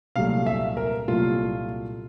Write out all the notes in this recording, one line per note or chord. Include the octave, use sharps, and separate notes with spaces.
C2 A#2 F#3 A3 F5
E5
A#4
C2 A#2 F#3 A3 F4